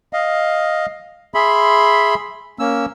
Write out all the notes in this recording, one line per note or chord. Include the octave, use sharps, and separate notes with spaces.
D#5 F5
G#4 E5 B5 C6
A#3 C#4 E6